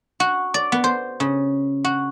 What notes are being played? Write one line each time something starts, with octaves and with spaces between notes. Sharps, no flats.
F#4
D5
B3
C5
C#3
F#4